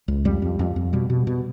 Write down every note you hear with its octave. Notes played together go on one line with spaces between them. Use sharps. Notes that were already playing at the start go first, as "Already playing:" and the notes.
C#2
F2 G3
F2
F2
F2
B2 G3
B2
B2